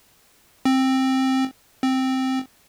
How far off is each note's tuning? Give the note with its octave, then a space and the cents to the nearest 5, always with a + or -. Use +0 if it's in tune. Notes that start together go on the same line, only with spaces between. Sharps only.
C4 +10
C4 +0